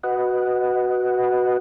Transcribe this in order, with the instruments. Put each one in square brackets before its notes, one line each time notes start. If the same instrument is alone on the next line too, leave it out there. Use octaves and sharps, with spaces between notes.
[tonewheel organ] F#4 B4 D#5 F#5